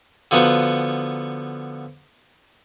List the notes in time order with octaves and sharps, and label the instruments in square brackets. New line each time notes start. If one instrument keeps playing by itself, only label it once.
[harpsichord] D3 F3 B3 D#4 F#4